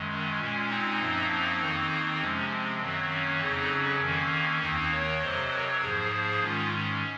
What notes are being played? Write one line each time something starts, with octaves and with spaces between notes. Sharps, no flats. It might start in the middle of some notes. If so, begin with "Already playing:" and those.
Already playing: F#2 D#3 G#3
C#4
A#2 G#3
C4 D#4
F#2 F3 A#3
C4 D#4
F2 D#3 A#3
C3 F3 G#3 C#4
C4
F#2 D#3 F#3 A#3
C#4
F2 C#3 F#3 C4 D#4
C#4
F2 D#3 A#3 C#4
D#2 D#3 A#3 C4 D#4
A#4 C#5
F2 C3 F#3 C5 D#5
A#4 C#5
G#2 F3 A#3 G#4 C5
G#4 C5
G#2 D#3 G#3 C#4 F4
C#4